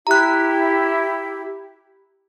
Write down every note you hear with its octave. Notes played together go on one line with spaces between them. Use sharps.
E4 G4 A#5 F#6